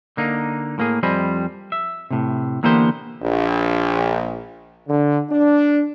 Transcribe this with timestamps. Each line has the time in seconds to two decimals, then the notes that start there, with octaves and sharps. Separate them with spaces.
0.17 D3 A#3 D#4
0.78 A2 A#3 G#4
1.03 F2 G3 C5 D#5 G#5 B5
1.72 E5
2.11 A2 C3
2.63 D3 E3 A#3 B3 G4 C5
3.23 A#1
4.88 D3
5.30 D4